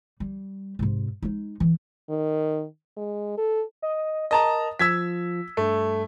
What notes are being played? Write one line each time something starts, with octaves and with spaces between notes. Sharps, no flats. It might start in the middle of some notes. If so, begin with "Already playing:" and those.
G3
G#2 C3
G#3 D#4
E3
D#3
G#3
A4
D#5
A#4 D#5 A5 A#5
F3 E6 G#6 B6
G2 A3